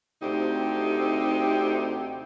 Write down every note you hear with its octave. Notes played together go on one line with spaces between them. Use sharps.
D2 C3 A3 C4 D#4 G4